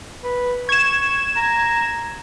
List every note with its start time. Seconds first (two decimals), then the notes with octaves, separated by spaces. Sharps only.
0.23 B4
0.69 C#6 G#6 E7
1.36 A#5